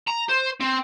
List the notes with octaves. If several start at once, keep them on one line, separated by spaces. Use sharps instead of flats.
A#5
C5
C4